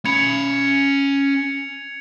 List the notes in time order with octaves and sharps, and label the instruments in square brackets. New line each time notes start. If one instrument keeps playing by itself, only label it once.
[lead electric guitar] C#4 B5 [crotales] G#6 C#7 F7